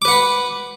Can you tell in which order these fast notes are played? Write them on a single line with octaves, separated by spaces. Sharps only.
D6 B4 F#5 B5